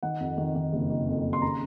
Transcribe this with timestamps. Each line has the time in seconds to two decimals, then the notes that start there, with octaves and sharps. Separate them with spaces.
0.03 D#3 F#5
0.20 F2
0.38 D#3
0.56 D#3
0.73 F#1
0.90 D#3
1.08 F2
1.25 D#3
1.33 C6
1.42 C#3 A#5